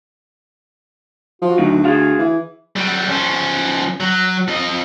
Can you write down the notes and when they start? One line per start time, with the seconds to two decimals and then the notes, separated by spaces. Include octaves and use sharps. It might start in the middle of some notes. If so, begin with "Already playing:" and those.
1.42 F3 F#4
1.58 D2 D#3 F#3 D#4
1.84 F#4 G#4 F5
2.19 E3
2.76 F#3 G3
3.09 F3 C#4
4.00 F#3
4.48 F2 D#5